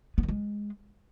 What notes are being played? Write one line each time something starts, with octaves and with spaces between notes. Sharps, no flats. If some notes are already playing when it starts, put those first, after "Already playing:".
B3
D#3
G#3